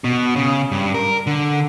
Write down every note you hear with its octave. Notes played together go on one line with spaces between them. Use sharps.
B2
C#3
G2
A#4
D3